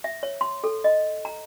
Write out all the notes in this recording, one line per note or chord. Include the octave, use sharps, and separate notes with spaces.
E5
C#5
C6
A4
D#5
A#5